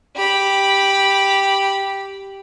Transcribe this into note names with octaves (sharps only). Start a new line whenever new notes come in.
G4 B5